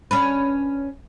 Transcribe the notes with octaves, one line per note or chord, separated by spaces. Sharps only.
C#4 D4 B4